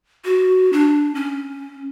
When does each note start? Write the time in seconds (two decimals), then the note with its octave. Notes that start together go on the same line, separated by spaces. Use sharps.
0.25 F#4
0.73 D4
1.15 C#4